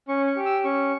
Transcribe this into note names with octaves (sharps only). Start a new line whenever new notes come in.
C#4 C#6
C#6
G4
E6
C#4 C#6